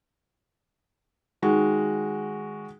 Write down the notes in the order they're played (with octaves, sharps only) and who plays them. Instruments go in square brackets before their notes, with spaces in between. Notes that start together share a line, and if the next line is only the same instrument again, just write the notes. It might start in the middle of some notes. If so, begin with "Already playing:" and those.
[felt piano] D#3 G#3 F#4